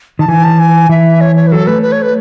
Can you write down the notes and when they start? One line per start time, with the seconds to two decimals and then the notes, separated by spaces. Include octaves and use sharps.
0.19 D#3 A5
0.28 E3 G#5
0.44 A5
0.59 G#5
0.89 E3 E5
1.21 C#5
1.36 C#5
1.47 B4
1.52 F#3 A4
1.67 A3 B4
1.82 B4
1.92 C#5
2.02 B4